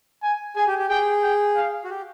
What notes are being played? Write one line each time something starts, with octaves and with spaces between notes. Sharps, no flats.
G#5
G#4 G#5
G4
G4
G#4 G5
G5
F5
F#4
G4